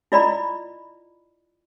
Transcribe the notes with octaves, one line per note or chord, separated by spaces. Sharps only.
E4 F4 D5 D#5 A#5 B5